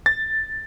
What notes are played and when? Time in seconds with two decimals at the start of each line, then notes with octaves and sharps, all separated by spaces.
0.06 A6